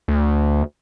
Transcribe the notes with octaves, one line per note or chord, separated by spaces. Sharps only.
D2